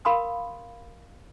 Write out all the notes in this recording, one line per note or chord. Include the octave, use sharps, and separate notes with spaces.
A#4 F5 B5 C6 D#6